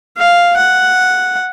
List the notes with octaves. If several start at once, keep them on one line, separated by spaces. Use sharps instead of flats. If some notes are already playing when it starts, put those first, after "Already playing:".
F5
F#5